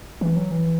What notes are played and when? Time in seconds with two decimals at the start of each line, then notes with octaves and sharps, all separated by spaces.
0.21 E3
0.36 F#3
0.51 E3